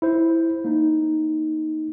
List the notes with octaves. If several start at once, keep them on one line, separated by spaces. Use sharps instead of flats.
E4 C5
A#3 D#4